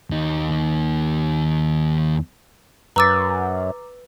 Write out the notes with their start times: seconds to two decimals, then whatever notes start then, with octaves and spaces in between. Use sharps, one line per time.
0.11 D#2 D#4
2.96 F#2 B4 A#5 D6 E6 A6